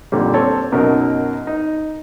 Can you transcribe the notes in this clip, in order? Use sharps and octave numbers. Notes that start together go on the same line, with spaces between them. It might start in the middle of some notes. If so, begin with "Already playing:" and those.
F2 A#2 D3 G3
C4 A4 C#5 A5
F#2 B2 F#3 D#4 A#4
D#4